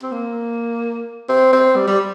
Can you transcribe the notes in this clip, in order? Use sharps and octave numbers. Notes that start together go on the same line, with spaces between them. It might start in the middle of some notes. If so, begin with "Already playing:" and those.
C4
A#3
C4
C4
G3
G3